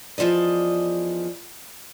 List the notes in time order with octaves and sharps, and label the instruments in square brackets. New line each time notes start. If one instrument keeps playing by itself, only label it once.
[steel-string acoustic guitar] E2 C3 F3 D5 D#5